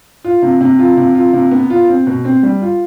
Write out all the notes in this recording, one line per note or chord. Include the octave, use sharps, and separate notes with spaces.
F4
C3
C3
F4
C3
F4
C3
B3
F4
C4
B2
C4
G3
F4